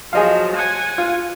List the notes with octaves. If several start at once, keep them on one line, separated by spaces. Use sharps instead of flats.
F3 F#3 G#4 D#5 F5
F#5 G#5
F4